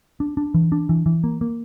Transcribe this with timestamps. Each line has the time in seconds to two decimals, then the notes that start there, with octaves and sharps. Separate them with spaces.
0.20 D4
0.37 D4
0.54 E3
0.72 D4
0.89 E3
1.06 E3
1.24 A#3
1.41 A#3